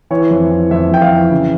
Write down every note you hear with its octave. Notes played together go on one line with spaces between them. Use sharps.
E3 C#5
F2
E3
F2 E5
F2 G5
F5
E3
C#3